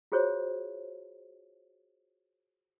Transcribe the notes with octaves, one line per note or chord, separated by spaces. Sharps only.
F4 F#4 G#4 C5 C#5